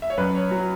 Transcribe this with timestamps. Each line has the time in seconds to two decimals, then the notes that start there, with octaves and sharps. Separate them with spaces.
0.02 E5
0.10 C#5
0.17 F#2 B4
0.35 C#5
0.51 F#3